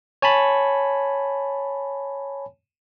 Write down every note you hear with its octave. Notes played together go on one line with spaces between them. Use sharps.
C#5 G#5 A5 B5